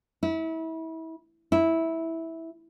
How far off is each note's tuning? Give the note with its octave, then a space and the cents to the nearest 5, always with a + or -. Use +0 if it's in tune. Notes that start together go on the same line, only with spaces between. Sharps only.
E4 -30
E4 -10